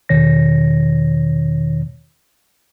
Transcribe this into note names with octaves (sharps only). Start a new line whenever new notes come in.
E2 B2 D#3 C#5 A#6